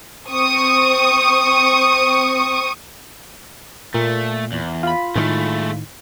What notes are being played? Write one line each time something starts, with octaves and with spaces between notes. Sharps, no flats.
C4 C#6 D#6
A#2 A3
E2
F4 B5
A2 D#3 G#3 A3